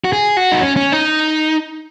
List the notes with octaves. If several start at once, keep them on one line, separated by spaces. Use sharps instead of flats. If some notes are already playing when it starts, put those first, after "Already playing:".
F#4
G#4
F#4
D#4
C#4
C#4
D#4